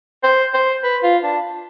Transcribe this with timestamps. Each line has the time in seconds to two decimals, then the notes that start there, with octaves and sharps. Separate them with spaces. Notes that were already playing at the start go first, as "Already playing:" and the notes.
0.24 C5
0.54 C5
0.83 B4
1.03 F4
1.24 D4